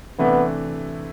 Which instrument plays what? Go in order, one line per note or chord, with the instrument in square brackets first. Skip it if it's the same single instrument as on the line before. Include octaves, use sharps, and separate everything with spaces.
[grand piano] C3 E3 A3 D4 [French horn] B3